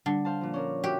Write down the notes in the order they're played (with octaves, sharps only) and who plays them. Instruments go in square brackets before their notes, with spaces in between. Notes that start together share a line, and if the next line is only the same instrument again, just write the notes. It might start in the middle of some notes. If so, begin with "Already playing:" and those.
[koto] D3 [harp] G3
[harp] C5 F5 A5
A#2 F3
C#4 D4 A#4
[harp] F#4 E5 [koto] G4